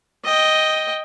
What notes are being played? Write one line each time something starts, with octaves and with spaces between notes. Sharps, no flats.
D#5 G5